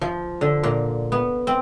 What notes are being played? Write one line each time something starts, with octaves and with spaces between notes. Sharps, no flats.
F3
D3
A#2
B3
C4